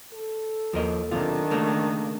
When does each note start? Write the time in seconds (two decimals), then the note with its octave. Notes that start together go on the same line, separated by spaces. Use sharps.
0.13 A4
0.73 D#2 F3 A#4 D#5
1.11 B1 C3 D#3 D4 F4
1.51 C#3 A3 A#3